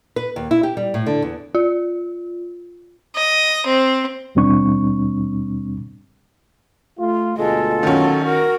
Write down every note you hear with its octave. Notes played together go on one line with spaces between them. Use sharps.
B4
D#2
E4
G4
G3
A2
D3
E2
F4
D#5
C4
D#2 B2 G3 C4 D4 C#6
A3 F4
D2 B2 G#3 F4 A4
D#3 F#3 C#4
F#4 A#4